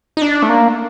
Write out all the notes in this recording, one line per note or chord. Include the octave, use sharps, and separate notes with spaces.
D#4
D4
A3
A#3